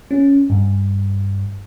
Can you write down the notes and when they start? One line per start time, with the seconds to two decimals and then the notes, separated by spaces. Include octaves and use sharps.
0.11 C#4
0.50 G2